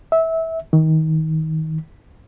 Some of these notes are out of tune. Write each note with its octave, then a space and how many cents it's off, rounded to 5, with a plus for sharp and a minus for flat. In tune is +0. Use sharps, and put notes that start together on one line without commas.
E5 -20
D#3 +25